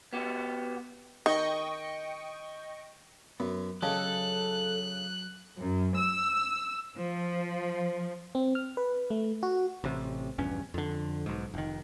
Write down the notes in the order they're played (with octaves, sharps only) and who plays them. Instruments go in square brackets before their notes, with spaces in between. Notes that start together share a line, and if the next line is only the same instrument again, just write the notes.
[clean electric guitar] B3 F#4 G4
[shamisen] D#3 [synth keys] D#5 G5 C#6
[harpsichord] F#2 [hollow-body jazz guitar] B3
[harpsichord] C#3 [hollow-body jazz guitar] F#3 G4 D#5 [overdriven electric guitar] A4 [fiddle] F#6
[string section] F#2
E6
F3
[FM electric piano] C4
F6
B4
A3
F#4
[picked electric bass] A1 C3
A#1 E2 G2 C#4
F2 D3
B1 G#2
F1 D#3